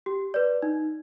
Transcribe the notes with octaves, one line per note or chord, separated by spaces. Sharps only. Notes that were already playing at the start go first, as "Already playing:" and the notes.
G4
B4 D5
D#4